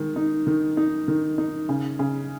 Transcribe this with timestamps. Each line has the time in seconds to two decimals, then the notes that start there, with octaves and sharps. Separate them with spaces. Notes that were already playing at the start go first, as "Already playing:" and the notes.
Already playing: D#3 G#3
0.16 D#4
0.47 D#3
0.77 D#4
1.08 D#3
1.38 D#4
1.69 C#3
1.99 C#3